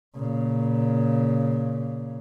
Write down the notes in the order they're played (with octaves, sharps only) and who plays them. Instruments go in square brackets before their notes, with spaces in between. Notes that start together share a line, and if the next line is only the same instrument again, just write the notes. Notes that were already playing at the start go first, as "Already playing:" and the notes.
[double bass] A#2 C#3